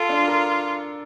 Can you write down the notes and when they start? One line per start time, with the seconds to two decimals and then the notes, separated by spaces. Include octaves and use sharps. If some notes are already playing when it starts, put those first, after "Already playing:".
Already playing: F4 A4
0.09 D4
0.28 A#4